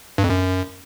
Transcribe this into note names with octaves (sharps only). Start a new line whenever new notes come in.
G2
F2
F#2